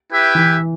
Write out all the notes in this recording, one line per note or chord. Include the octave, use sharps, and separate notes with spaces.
E4 G4 B4 E5 G5
E3